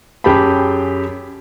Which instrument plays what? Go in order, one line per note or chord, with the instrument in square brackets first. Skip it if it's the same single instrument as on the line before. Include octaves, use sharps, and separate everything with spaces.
[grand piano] F#2 G4 G#4 G5 A5 B5